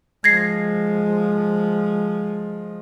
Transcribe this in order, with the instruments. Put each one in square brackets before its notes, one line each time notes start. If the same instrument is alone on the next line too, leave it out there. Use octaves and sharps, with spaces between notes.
[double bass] F3 G#3 [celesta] G#6 A#6 C7